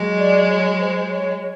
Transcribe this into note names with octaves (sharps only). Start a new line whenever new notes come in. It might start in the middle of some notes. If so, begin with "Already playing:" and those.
Already playing: F#3 G#3
D5
C#5
C5
C#5
C#5